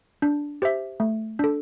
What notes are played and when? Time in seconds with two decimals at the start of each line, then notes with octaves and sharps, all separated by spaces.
0.22 D4
0.62 G4 C5 E5
1.00 A3
1.39 D4 A4